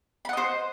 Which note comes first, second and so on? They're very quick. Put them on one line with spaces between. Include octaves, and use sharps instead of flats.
B5 F#5 D#5 C5